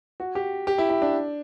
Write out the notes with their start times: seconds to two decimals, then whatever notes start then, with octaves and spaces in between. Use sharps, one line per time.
0.20 F#4
0.35 G4
0.67 G4
0.78 E4
0.90 E4
1.02 D4